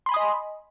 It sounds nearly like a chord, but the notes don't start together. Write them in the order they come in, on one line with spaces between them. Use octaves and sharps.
C6 B5 G#5 D#6 D#5